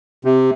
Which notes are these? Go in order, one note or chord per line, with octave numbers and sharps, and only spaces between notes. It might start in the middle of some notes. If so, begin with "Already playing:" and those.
C3